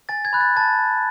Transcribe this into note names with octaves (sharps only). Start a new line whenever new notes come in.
G#5 A6
G#6
B5 F#6
A6
A5 A6